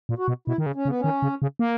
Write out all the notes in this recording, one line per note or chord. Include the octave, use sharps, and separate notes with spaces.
A#2
F#4
B2
B2 E4
D#3
C#3
C#4
C#3
B3
D#3 C#4
C#3
C#3
A#3